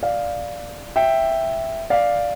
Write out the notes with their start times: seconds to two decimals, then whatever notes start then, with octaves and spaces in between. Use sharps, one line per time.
0.03 D5 F5
0.96 E5 G5
1.90 D5 F5